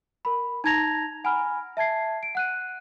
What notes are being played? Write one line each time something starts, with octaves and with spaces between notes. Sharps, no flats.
A#4 B5
D#4 A5 A#5 G#6 A#6 F7
F#5 G#5 A#5 B5 F6
E5 A5 G#6 C7
D7
F#5 F#6 D#7